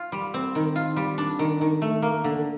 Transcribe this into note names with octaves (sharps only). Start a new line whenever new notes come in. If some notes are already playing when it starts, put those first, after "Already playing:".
Already playing: F4
G3
C4
D#3
F4
G3
D4
D#3
D#3
A3
A#3
D3